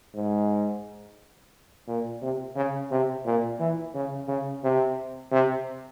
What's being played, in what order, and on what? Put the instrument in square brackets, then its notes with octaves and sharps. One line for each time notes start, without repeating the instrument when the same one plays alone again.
[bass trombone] G#2
A#2
C3
C#3
C3
A#2
E3
C#3
C#3
C3
C3